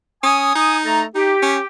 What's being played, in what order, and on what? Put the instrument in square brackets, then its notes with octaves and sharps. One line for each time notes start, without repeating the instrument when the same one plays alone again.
[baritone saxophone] C#4 [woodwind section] G#5 D#6
[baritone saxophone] D#4
[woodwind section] A3 A4 A#5
[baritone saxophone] D#4 [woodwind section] G4
[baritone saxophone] C#4